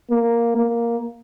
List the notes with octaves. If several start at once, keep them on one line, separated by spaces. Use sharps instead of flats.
A#3
A#3